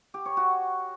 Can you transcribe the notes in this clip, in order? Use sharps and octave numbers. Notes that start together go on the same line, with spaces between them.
G4
C#5
F#4